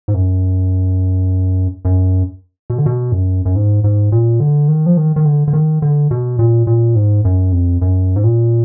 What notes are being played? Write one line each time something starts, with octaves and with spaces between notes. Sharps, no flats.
G#2
F#2
F#2
B2
D3
B2
F#2
F#2
G#2
G#2
A#2
D3
D#3
F3
D#3
D#3
D3
D3
D#3
D3
B2
A#2
A#2
G#2
F#2
F2
F#2
G#2
A#2